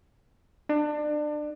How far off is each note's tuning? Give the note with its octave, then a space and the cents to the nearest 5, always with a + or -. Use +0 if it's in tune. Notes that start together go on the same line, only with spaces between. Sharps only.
D4 +30